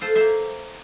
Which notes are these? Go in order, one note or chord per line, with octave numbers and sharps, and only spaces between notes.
F4 A4 C5
A#3 C5 E5